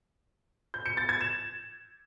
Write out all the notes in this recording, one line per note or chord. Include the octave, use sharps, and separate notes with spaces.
G6
C#7
A6
G#6
E7